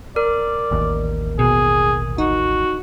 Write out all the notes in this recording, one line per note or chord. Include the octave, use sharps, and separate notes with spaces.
A#4 D5
A1 D#2
B2 G#4
D#4 F#4